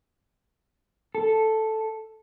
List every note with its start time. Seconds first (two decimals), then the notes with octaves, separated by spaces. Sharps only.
1.15 A4